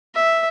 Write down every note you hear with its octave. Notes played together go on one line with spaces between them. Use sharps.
E5